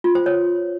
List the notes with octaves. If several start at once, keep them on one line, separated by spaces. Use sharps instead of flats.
F4
C5
C#5